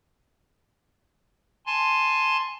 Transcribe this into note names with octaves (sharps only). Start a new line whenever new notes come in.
G#5 A5 C6